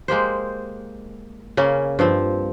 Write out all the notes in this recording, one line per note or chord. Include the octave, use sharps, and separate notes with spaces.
G#3 A#3 G4 C5
C#3 A#3 C#4
G2 F3 C4